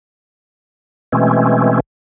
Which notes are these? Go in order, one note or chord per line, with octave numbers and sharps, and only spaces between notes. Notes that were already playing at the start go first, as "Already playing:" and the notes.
B2 E3 G#3 A3 C4 C#4